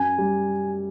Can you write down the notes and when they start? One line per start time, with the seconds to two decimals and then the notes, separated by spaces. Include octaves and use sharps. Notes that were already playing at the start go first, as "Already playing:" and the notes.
Already playing: F#2 G#5
0.18 G3